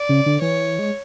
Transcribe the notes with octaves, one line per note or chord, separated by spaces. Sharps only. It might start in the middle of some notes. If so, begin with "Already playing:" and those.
Already playing: D5
C#3
D3
E3 C#5
G#3